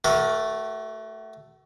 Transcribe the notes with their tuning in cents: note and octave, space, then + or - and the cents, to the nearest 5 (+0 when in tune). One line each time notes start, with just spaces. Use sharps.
A3 +0 F#4 +35 A#4 +45